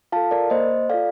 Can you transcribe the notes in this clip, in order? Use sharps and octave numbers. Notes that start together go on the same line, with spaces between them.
F4 A4 F5 A5
A#4 D5
A#3 C5 D#5
F4 A4 D5 F5